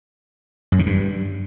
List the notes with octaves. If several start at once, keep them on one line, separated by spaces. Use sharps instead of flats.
F#2
D#3
G2